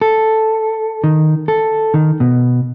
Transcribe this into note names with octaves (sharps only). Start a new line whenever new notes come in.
A4
D#3
A4
D#3
B2